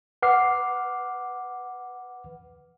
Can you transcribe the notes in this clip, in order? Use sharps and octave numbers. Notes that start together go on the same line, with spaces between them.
B4 F#5 D6 F6 C7